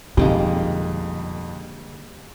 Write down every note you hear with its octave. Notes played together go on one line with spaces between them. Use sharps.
B1 F2 D3 G3 G#3 A#3